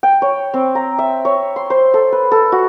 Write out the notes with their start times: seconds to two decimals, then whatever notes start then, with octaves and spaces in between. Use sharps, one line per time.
0.03 G5
0.22 C#5
0.54 C4
0.75 A#5
0.99 E5
1.25 C#5
1.56 C6
1.70 C5
1.94 A4
2.12 B4
2.32 A4
2.52 F#4